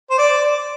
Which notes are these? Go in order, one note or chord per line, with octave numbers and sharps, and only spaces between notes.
C5
D5